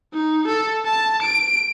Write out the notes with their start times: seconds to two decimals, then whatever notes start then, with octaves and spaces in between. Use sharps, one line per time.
0.13 D#4
0.48 A4
0.86 A5
1.22 D7